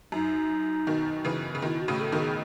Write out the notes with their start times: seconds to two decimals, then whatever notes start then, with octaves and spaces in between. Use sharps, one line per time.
0.12 F#2 D#4
0.87 B2 D#3
1.25 C#3 E3
1.55 C#3
1.62 B2 D#3 E4
1.81 F#4
1.88 A2 C#3
2.01 A4
2.12 B2 D#3
2.19 G#4